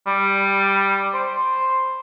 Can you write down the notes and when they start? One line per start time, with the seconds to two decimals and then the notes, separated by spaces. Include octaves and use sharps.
0.07 G3
1.14 C5